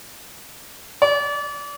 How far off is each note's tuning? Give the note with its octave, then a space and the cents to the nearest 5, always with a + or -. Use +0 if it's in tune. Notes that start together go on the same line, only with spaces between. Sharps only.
D5 -30